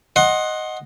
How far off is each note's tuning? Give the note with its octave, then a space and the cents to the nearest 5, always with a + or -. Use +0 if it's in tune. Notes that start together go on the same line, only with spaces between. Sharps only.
D#5 +0 F#5 +0 C6 +25